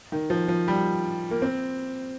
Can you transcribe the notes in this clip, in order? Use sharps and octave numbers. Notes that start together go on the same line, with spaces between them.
D#3
F3
F3
G3
A#3
C4